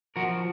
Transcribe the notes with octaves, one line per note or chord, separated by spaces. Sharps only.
F3 F#4 A#4